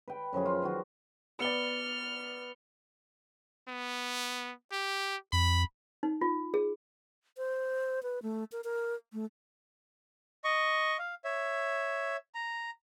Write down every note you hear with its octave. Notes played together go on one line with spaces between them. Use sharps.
B4 G5
F#2 F3 F#3 G#4
F4
D#3 F#3 F#4
B3 D5 F6 C#7 G7
B3
G4
F2 B5
D#4
F4
G#4
C5
B4
A3
A#4
A#4
A3
D#5 C#6
F5
C#5 E5
A#5